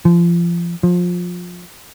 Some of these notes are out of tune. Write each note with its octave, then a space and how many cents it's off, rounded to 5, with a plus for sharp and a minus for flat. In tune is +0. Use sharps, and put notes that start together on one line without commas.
F3 -30
F3 +20